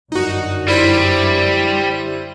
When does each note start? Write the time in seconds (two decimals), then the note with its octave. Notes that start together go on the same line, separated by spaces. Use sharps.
0.12 G1 F#2 D3 D#4 F#4
0.68 G3 E4 C5 D#7